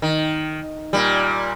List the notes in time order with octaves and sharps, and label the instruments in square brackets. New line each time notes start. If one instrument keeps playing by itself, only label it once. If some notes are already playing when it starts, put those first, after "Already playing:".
[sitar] D#3
A#2 G3